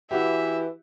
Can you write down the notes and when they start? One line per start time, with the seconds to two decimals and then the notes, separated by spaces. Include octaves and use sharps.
0.11 E3 E4 F#4 G4 E5